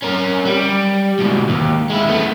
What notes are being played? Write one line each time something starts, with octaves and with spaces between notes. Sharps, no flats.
C#4 A#4
G3
G#2 B2
D#2
G#3 E4
A3 B3